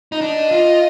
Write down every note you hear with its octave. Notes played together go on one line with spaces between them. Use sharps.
D#4
D4 D#5
F4